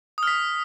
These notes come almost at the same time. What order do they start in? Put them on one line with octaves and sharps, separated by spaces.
D#6 F6 B6